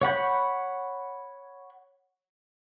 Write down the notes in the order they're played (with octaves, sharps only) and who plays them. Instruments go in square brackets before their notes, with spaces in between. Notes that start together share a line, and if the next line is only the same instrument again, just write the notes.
[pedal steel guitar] C#5 F#5 B5 G6